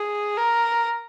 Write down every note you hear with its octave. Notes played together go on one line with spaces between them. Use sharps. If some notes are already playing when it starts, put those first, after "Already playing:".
Already playing: G#4
A#4